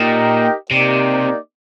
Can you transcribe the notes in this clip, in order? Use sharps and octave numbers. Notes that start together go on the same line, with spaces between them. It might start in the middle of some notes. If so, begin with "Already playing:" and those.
Already playing: A#2 D#4 G4 A#4 D#5 G5
C3 A#3 D#4 G4 D5